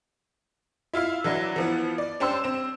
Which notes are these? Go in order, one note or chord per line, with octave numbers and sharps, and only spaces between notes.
E4 F4 E5 F5
E3 F#3 D4 E4
E3 F3 B3
D5
C#4 D4 G4 C5 C6 E6
C4 E7